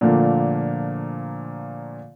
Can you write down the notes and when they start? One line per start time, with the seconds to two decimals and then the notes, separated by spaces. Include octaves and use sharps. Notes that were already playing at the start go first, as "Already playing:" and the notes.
0.01 A#2 D3 F3 A3 A#3